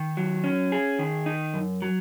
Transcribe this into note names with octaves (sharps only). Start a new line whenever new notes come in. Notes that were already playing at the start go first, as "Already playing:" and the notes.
Already playing: D#3
F#3
C#4
G#4
D#3
D#4
F#2
F#3